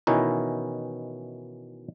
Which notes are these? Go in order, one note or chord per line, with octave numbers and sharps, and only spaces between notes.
B2 D#3 E3 C#4 D#4 E4